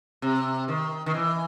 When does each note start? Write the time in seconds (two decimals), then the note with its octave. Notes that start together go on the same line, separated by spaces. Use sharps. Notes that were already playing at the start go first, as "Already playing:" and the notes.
0.22 C3
0.68 D#3
1.06 D#3
1.14 E3